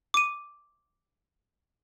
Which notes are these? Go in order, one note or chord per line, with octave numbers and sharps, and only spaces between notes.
D6 D#7